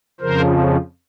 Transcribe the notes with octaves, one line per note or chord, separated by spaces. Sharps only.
F2 C#3 F3 A#4 C5